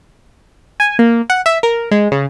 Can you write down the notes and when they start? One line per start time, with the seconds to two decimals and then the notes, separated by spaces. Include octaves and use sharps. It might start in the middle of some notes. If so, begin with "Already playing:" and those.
0.80 G#5
0.99 A#3
1.30 F#5
1.46 E5
1.63 A#4
1.91 G#3
2.12 C#3